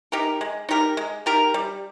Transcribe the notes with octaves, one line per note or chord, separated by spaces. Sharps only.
D#4 G4 A#4
G#3
D#4 G4 A#4
G#3
D#4 G4 A#4
G3